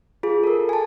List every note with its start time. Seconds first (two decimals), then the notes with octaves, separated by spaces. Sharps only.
0.23 F4 G#4
0.44 A4 A#4
0.69 G#5 A5